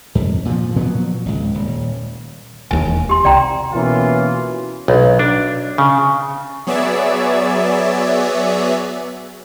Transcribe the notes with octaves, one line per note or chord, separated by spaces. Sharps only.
F2
A#2 F3
A#2 F3 F#3 B3
G#1 C#2
D#1
E1 D#2 G#5
G4 C6
C2 D5 G5 A#5
B2 E3 A#3 C#4 F4
B1
D4
C#3
F#3 B3 G#4 C#5 D5 E5